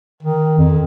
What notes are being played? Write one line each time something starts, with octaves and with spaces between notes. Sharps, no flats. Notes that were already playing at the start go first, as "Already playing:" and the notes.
D#3
F2